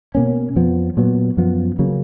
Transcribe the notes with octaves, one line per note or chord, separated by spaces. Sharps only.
B2 A#3 C#4
F2 F3 B3
A#2 F#3 B3
F#2 F3 B3
C#3 F#3 A#3